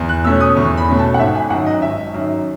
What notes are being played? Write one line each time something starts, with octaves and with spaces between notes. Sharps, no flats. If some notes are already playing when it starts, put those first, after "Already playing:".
Already playing: E2
F#6
B2 A3 C#4 E6
D#6
E2 C#6
B5
B2 A3 C#4
A5
F#5
G#1 E5
G#5
F#2 D#3 F#5
D#5
G#1 E5
F#2 D#3